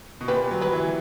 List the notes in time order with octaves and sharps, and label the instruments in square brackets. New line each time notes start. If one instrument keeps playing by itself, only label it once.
[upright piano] B2
[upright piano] A#2 [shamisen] G4 B4
[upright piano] F#3
[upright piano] F#3 [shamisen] G4 B4
[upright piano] E3